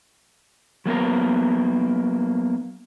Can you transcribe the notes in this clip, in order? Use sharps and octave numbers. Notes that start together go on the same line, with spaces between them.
F#3 A#3 B3 A#4